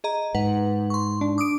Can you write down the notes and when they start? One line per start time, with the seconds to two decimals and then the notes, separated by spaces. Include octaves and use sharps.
0.04 G#4 D#5 A#5
0.35 G#2 B4 F#5
0.90 C6 C#6
1.21 D4
1.38 D6 D#6 D7